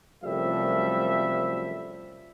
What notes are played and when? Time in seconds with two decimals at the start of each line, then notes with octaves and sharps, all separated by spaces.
0.24 C2 F#2 F3 G3 A3 E5